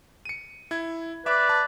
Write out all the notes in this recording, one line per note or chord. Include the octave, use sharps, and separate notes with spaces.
C#7 D#7
E4 G#6
B4 D5 E5 D6
A5